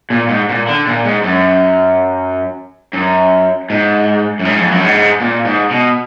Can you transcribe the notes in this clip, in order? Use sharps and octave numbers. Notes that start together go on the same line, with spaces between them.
A#2
G#2
A#2
D3
A#2
G#2
F#2
F#2
G#2
F#2
G#2
F2
F#2
G#2
A#2
G#2
B2